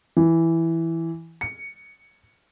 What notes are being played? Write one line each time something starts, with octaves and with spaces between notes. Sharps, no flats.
E3
C#7